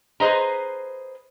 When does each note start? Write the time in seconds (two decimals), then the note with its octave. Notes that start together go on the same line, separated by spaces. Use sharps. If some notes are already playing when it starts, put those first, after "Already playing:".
0.20 G#4 B4 C5 D#5 A#5